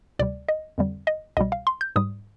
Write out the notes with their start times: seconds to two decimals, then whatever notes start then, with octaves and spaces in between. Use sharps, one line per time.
0.19 D2 C3 G3 D5
0.49 D#5
0.78 F2 D3 G3
1.07 D#5
1.37 C2 B2 G3 D#5
1.52 F5
1.67 C6
1.81 G6
1.96 G#2 G3 D#6